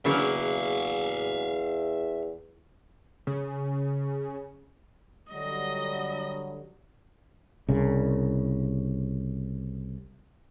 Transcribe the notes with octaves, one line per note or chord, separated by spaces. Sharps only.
E2 C#3 F#3 A#3 E5 F5
C#3
D3 F#3 G3 D#5 A#6
C2 C#3